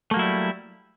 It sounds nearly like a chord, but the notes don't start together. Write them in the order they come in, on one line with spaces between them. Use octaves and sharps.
A3 A#3 F#3 E4 G3